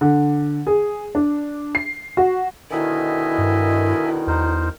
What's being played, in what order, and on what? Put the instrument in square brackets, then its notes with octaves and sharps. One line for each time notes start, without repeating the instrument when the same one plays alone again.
[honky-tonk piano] D3
G#4
D4
C7
F#4
[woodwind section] B2 D3 D#3 [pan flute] E4 [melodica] D#5 E5 G#5
[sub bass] G2
[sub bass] E2 [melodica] D#4 A#4 C5